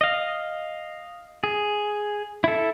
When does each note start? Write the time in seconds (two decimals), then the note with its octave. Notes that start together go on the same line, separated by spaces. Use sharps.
0.01 D#5 F5
1.44 G#4
2.44 E4 A4